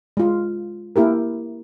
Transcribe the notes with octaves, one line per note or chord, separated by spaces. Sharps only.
G#3 F4
A#3 E4 G4 A#4